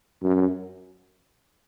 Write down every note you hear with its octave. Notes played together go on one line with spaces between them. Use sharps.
F#2